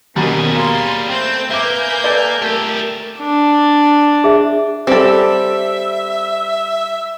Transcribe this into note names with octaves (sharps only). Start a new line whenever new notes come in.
D#2 B2 G3 C#4 G#4 A#4
A#3 C6
A3 C4 G6
A#3 B4 E5 G#5 D6 G6
A4 D5
A3 G4 A4 A#4
D4
G#4 E5
G3 C4 A4 E5